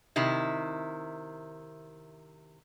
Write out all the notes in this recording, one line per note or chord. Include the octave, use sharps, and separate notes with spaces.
C3 D#3 E4